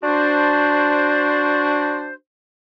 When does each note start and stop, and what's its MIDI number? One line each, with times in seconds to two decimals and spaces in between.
0.03 2.13 62
0.03 2.13 66
0.03 2.13 72